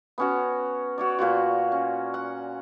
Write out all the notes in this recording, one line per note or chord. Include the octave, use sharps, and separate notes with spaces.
B3 C#4 F#4
F#4 C#5 D5
A#2 F4 F#4
C#4
F#5